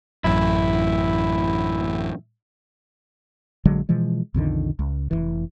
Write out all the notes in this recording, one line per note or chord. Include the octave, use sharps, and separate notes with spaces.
A1 F#2 E4
A#1 D3 F#3 G#3
B2 E3 F3 G#3
B1 F2 D3 D#3
C#2
F1 A#1 E3